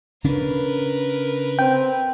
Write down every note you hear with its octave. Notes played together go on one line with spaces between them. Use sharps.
C#3 C#4 D4 A#4 B4
C4 G5